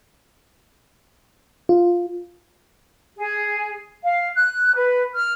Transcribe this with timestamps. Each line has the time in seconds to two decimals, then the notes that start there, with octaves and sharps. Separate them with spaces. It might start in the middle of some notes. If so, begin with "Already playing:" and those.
1.69 F4
3.16 G#4
4.03 F5
4.36 F#6
4.76 B4
5.13 F6